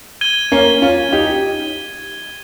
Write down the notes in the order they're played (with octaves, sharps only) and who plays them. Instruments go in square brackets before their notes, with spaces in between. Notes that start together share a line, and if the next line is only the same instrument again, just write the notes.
[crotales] G#6 D#7 G7
[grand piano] A#3 C#4
C#4 F4
D#4 G4